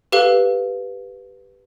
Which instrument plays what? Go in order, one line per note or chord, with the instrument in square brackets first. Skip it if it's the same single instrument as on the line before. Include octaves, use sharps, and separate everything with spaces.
[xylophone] G4 A4 B4 F5